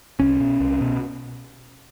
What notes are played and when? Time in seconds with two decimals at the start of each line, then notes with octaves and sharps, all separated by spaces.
0.19 C2 C#4
0.40 B2
0.60 C2
0.81 B2